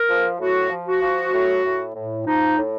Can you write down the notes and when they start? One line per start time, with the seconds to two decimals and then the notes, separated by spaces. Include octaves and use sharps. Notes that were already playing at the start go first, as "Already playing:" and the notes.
Already playing: A#4
0.08 F3
0.39 A2 F#4
0.70 F3
0.86 F#4
1.02 F3
1.33 A2
1.64 A2
1.96 A2
2.26 F3 D#4
2.58 A2